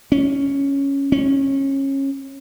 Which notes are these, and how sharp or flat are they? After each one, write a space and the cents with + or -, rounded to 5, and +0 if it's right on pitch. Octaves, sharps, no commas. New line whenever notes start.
C#4 +0
C#4 -25